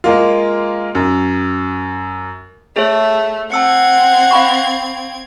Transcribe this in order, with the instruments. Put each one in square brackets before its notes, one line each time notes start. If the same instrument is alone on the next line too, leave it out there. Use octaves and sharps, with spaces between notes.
[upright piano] G#3 A#3 F4
F#2
[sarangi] A3 [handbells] G#4 C#5
[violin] C4 G#6 [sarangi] F#5 [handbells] A5 E6 C#7
[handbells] F5 B5 C#6